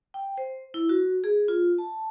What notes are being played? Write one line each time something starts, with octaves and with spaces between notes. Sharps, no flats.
G5
C5
E4
F#4
G#4
F4
A5